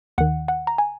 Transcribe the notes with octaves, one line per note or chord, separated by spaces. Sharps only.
D#2 D#3 F#5
F#5
A#5
G#5